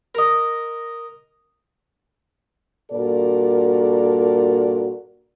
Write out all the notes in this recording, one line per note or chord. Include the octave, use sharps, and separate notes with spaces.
A#4 D#5
G2 A#2 F#4 A4 A#4 D5